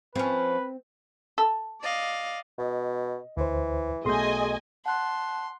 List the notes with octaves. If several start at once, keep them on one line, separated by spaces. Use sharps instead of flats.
F3 C4 C#4 B4
A4
D5 D#5 F5
B2 D#5
D2 E3 C5
B1 A3 G#4 D#5 G#5 C6 G6
F#5 A5 C6 F#6